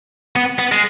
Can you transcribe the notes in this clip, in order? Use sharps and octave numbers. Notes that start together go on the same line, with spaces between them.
B3
B3
G#3